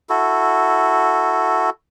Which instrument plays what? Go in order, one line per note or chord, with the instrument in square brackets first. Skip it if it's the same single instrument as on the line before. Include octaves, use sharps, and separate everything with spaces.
[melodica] E4 F#4 A4